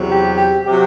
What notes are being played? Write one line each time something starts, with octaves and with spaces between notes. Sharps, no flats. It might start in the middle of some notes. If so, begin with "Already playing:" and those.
Already playing: E2 C3 F#3
G4
G4
C3 F#3 G4